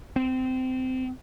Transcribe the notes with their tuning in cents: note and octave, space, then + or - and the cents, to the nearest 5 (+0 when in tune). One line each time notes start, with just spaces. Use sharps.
C4 -20